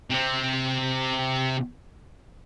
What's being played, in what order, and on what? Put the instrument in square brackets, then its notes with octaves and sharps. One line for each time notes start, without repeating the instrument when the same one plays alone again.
[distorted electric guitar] C3 C4